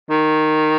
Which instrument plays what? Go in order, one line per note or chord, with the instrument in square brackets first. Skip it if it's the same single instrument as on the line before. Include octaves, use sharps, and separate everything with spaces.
[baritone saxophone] D#3